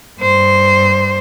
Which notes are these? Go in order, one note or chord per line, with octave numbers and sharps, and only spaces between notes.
G2 C5